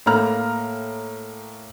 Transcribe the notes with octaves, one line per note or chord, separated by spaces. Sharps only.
A2 A#3 A#5 F6